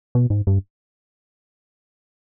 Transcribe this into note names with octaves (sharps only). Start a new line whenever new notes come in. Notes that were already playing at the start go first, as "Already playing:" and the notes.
B2
G#2
G2